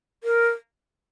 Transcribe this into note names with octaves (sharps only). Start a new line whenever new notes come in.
A#4